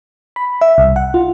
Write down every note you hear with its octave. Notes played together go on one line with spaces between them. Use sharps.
B5
E5
C2
F#5
F4